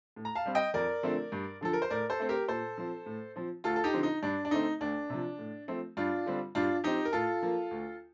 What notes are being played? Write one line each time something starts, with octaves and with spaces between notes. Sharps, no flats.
A2
A#5
F5 A5
G3 C4
D#5 G5
F2 A#4 D5
D3 F3 A3 C4
G2
D3 F3 A4
A#4
C5
A2 A#4 D5
A4 C5
A3 C4
G4 A#4
A#2 A4 C5
F3 C4
A2
F3 C4
D2 F4 A4
A4
D#4 G4
D3 F3 C4
D#4
G2 D4
D4
D3 A3 C4 D#4
D2 D4
C3 F3
A2
F3 A3 C4
G2 D4 F4
D3 G3 C4
G2 D4 F4
F3 C4 D#4 G4
A#4
A2 F4 A4
F3 A#3
D2